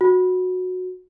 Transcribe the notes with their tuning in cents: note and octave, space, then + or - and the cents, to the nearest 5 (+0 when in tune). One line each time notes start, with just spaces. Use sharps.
F#4 -15